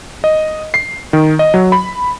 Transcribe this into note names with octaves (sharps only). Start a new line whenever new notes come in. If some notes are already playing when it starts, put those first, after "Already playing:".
D#5
C7
D#3
D#5
F#3
B5